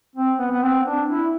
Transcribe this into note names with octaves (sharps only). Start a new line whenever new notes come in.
C4
B3
B3
C4
D4
E4